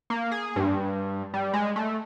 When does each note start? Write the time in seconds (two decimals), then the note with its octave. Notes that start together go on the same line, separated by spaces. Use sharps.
0.10 A#3
0.32 G#4
0.56 G2
1.34 G3
1.54 G#3
1.76 A3